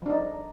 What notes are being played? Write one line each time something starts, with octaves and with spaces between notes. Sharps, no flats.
F3 D4 D#4